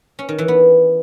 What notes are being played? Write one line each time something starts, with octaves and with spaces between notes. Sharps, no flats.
C#4
D#3
E3
B3